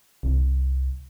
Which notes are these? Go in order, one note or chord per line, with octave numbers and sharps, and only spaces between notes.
C2